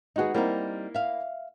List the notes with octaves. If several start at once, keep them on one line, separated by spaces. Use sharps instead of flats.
G#3 B3 D#4 F#4 G#4
G3 A#3 C4 D#4 E4 A#4
E5 F5